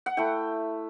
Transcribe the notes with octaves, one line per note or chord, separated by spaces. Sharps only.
F#5
A3 E4 G5